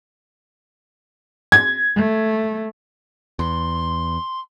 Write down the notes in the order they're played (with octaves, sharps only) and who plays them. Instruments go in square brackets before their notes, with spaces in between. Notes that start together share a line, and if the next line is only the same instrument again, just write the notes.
[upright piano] G#6
[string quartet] A3
[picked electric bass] E2 [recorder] C6